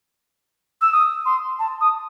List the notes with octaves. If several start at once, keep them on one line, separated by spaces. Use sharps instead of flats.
E6
D#6
C6
A5
D#6